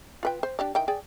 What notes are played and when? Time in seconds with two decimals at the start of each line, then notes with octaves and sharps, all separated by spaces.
0.23 F4 B4 G5
0.43 C5
0.59 D4 G4 D5
0.75 D#3 E3 G5
0.88 G#4 D5 G5